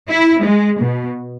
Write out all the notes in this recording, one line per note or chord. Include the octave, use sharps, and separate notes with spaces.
E4
G#3
B2